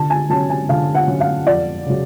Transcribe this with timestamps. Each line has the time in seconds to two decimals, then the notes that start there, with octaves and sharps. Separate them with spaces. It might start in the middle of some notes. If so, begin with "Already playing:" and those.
Already playing: D3 A5
0.10 G#5
0.30 F#3 C#4 A5
0.50 G#5
0.69 D3 F5
0.95 F#5
1.08 F#3 C#4
1.20 F5
1.46 F2 D5
1.86 C#3 F#3